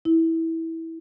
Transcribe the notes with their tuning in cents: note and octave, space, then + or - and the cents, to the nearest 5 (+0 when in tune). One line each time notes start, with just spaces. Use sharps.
E4 -15